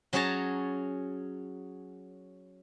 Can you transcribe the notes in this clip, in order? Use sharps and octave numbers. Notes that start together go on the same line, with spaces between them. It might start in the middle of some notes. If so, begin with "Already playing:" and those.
F#3 C#4 G#4 C#5 A5 A#5